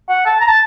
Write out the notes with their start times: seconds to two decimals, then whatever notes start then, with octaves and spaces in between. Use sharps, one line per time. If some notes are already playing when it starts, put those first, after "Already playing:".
0.09 F#5
0.26 A5
0.40 A#5
0.48 A5